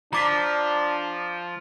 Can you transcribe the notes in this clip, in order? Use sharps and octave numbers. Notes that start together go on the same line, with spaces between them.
F3 D4 A#5 D6 B6